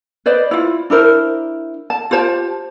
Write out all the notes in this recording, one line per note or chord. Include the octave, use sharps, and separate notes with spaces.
B4 C5 D5 D#5
E4 F4
D4 E4 A#4 C5
A5
F4 G4 C5 A5